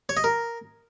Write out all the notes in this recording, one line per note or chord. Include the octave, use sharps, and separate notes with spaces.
C#5
D#5
A#4